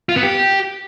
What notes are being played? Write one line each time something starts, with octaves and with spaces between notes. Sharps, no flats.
F4
B3
G4